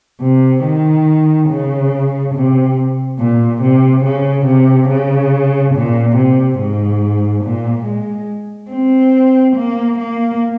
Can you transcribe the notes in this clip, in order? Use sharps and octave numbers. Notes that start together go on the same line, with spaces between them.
C3
D#3
C#3
C3
A#2
C3
C#3
C3
C#3
A#2
C3
G#2
A#2
G#3
C4
A#3
A#3